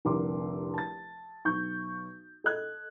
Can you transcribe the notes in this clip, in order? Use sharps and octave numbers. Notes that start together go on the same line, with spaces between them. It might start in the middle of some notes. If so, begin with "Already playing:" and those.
F1 C2 D3 A#4 C6 D6
A5 A6
B1 C#6 G6
A4 D#5 F#6 G#6